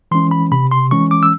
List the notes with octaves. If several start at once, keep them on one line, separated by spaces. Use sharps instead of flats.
E3 G#3 C#4 C6
B5
C3 B5
C6
E3 G#3 C#4 C#6
D6
E6